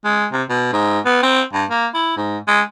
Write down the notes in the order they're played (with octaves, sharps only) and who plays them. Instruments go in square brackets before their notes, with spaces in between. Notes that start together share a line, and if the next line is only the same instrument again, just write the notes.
[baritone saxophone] G#3
C3
B2
G#2
B3
C4
G2
A#3
E4
G#2
G#3